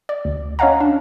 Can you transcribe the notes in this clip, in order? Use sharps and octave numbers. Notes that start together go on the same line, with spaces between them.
D5
D2
C#4 C#5 D#5 F5 F#5 A#5
D4